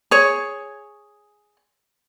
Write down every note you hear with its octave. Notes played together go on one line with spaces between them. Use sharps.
G#4 C#5